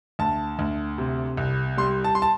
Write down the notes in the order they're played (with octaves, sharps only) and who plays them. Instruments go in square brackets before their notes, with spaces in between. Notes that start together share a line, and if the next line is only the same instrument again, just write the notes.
[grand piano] D2 A5
D2
C3
C2
G3 C6
A5
C6
A5